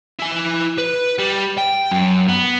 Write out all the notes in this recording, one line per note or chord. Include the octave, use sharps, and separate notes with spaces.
E4 G#5
B4
G3
G5
F#2
B3